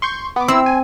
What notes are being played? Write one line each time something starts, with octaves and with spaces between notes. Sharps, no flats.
C6 C#6 G6
B3 D6
C4 E4 E6
G#5